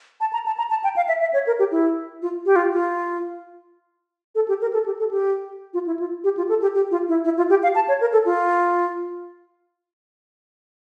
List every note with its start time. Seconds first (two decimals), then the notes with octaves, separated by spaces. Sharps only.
0.20 A5
0.33 A#5
0.46 A5
0.58 A#5
0.70 A5
0.84 G5
0.96 F5
1.08 E5
1.21 E5
1.33 C#5
1.47 A#4
1.59 G4
1.72 E4
2.22 F4
2.46 G4
2.56 F4
2.72 F4
4.35 A4
4.48 G4
4.61 A#4
4.73 A4
4.86 G4
4.99 A4
5.11 G4
5.74 F4
5.86 E4
5.99 F4
6.24 G4
6.37 F4
6.49 A4
6.62 G4
6.75 G4
6.91 F4
7.08 E4
7.24 E4
7.37 F4
7.50 G4
7.63 F5
7.75 A5
7.88 C#5
8.01 A#4
8.13 A4
8.25 F4